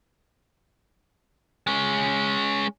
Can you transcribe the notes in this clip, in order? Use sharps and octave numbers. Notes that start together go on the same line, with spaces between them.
G#3 C#4